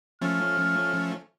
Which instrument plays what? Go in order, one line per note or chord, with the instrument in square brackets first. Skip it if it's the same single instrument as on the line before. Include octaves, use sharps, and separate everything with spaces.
[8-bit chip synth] F3 A3 C#4 [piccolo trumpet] F6